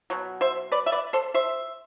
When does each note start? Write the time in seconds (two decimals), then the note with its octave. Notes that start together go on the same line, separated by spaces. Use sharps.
0.10 B2 F#3
0.41 C5 E5
0.72 B4 D5
0.86 E5
0.92 B4 D5
1.13 A4 C5
1.34 C5 E5